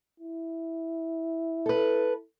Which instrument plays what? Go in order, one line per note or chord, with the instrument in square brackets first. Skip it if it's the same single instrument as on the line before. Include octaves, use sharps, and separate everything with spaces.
[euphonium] E4
[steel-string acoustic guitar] A4 B4